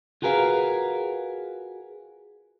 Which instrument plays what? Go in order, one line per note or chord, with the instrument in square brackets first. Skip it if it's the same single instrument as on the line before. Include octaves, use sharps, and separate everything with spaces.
[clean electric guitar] F4 F#4 G#4 A#4 B4 F5